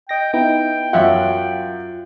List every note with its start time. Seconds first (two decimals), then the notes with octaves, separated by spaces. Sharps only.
0.09 D#5 G5 A#6
0.34 B3 D#4 E4 G5
0.93 F#2 F4 E5 F#5